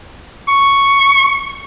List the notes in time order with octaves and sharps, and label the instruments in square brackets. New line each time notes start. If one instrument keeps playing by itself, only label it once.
[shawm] C#6